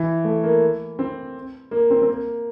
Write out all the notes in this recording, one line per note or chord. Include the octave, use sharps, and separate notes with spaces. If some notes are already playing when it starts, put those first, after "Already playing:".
Already playing: E3
A3
A#3
C4
A#3
C4
C4
A#3